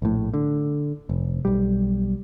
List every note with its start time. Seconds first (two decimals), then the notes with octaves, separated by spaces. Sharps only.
0.02 A#1 A2
0.34 D3
1.09 F1
1.45 B1 G3